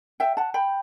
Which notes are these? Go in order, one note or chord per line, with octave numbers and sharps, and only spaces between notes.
E5 G5
F#5 A5
G5 B5